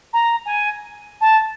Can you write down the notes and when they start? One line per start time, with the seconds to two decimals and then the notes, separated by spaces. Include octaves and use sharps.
0.13 A#5
0.45 G#5
1.20 A5